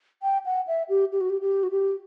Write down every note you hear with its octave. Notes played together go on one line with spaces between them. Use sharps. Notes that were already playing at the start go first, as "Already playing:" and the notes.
G5
F#5
E5
G4
G4
F#4
G4
G4
F#4
G4